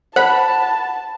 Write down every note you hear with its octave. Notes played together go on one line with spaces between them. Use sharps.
C5 F#5 A5 B5